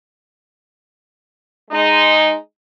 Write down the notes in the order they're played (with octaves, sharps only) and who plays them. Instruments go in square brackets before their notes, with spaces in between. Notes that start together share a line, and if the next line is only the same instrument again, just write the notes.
[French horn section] G#3 D#4